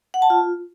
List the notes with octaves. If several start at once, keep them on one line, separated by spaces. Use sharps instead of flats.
F#5
A5
F4